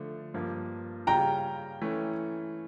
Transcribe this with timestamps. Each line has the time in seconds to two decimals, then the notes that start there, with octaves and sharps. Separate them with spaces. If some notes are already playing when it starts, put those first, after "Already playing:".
Already playing: D3 F3 A3
0.34 G2 F3 A#3
1.07 C#3 G3 C#4 F4 G5 A#5
1.81 E3 A3 C#4